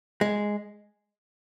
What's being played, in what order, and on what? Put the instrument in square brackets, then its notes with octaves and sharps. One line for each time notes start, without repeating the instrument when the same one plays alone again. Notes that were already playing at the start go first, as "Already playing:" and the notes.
[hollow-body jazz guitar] G#3